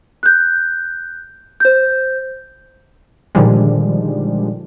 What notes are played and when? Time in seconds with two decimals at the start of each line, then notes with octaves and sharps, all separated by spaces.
0.23 F#6 G6
1.60 C5 G6
3.35 A#2 D3 D#3 F3 G3 G#3